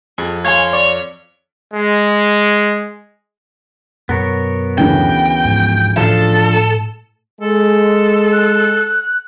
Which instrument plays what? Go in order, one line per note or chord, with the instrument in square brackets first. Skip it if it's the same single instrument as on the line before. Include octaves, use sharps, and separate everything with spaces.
[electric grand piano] F2 [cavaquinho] G#4
[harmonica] C#5 [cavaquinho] F5 C6 [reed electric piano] G#5 G#6
[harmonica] C#5 [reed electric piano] D5
[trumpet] G#3
[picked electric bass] F#2 B2 [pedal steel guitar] B3 A#4 C#5
[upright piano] D2 C#3 E3 [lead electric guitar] G5
[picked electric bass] G#2 F3
[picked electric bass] A2 [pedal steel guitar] F3 D4 F5 [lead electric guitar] A4
[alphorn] G#3 [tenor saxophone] A4
[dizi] F#6